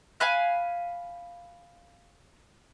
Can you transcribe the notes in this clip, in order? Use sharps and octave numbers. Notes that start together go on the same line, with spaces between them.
F5 G#5 B5 F#6